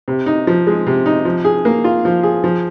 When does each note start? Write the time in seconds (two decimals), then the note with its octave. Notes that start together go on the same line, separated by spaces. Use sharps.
0.08 C3
0.26 D#4
0.47 F3
0.67 G#3
0.87 C3
1.06 D#4
1.25 F3
1.45 G#4
1.65 A#3
1.84 F4
2.05 F3
2.23 G#4
2.44 F3